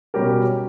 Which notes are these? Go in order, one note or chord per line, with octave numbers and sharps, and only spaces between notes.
B2 G3 C#4 G4 A#4